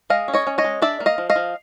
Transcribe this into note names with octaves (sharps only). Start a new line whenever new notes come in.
G#3 D#5 F5
C#4
C#5 D#5
C#4
C#5 D#5
G#3
D4 D5 E5
A#3
D#5 F5
F3
D#5 F5
F3